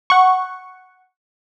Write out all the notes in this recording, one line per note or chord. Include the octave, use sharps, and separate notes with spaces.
F#5 C#6